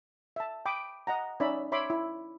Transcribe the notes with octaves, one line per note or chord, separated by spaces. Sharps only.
E5 A5
G5 B5 D6 D#6
D#5 F#5 A#5
C#4 D#4 D5 E5 B5
C#5 E5 B5 C6 D6
E4